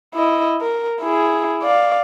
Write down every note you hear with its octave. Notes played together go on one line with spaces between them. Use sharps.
E4 D#5
A#4
E4 G#4
D5 F5